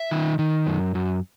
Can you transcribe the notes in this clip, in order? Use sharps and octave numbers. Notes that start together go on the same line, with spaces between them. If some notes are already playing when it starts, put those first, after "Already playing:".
Already playing: E5
D#3
D#3
F#2
F#2